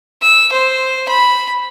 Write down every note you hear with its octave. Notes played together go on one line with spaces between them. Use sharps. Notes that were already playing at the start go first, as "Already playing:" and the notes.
E6
C5
B5